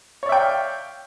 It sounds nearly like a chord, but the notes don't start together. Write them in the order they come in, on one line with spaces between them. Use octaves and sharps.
C#5 D5 E5 G5 F5